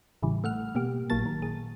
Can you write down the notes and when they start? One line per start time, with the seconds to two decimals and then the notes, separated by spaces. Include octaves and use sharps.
0.22 A1 A2 C#3 E3 G3
0.44 A3 F#5 F6
0.75 B2 A#3 G4
1.10 A1 A#2 F#3 A#3 A5 A6
1.26 D#3
1.42 G#4